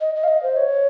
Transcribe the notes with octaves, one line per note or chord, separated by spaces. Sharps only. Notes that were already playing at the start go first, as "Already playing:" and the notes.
D#5
D#5
F5
D#5
C5
C#5